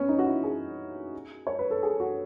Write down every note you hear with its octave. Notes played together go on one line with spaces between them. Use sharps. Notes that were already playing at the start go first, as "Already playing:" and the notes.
Already playing: B3 C#4
D#4
F#4
E4
G#4
C#5
B4
A4
G#4
F#4